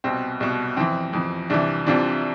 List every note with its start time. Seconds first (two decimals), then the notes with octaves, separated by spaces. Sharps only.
0.04 C2 B2 C4
0.40 C2 B2
0.77 F2 E3 C4
1.13 F2 E3
1.50 C2 C3 E3 D4
1.86 C2 C3 E3 D4 F4